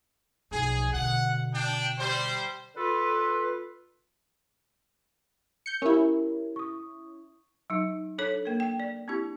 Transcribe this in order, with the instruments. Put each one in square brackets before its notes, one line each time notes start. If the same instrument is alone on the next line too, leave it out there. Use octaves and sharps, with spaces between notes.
[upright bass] B1 F3 [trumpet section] G#4
[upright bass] B2 D3 [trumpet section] F#5
[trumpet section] D4 G5
G3 C5
[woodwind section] D3 F4 A4 B4
[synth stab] G6 C#7
[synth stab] C#4 E4 [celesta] G4 A#4
[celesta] C#6 D#6
[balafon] F#3 D#4
D4 A4 C#5
A#3 A#4
G5
D5
C4 D4 E4 G4